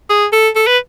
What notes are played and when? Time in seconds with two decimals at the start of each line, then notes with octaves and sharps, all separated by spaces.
0.09 G#4
0.32 A4
0.56 A4
0.67 B4